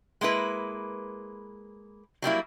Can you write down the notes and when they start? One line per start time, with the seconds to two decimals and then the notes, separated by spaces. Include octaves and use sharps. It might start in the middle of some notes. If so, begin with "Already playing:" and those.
0.21 G#3 A#3 E4 B4
2.22 F#3 G3 A#3 E4